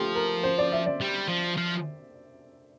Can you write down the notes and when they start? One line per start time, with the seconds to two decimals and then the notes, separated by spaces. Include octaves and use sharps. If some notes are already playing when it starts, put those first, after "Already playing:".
Already playing: F3 A3 G4 A4
0.15 A#4
0.43 C5
0.58 D5
0.72 E5
0.86 D5
1.01 G3
1.28 F3
1.57 F3